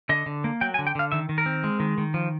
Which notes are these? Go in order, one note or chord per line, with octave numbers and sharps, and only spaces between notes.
D3 D#5
D3
A#3
F#3 G5
G#5
D3
G5
D3 F5
D#3 E5
D#3
A#4
C4
G#3
D#3
D#3
F3